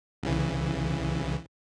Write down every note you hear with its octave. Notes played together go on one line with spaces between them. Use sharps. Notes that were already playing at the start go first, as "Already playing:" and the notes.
C2 C#3 E3